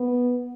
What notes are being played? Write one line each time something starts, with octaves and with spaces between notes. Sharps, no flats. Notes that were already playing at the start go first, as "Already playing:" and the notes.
Already playing: B3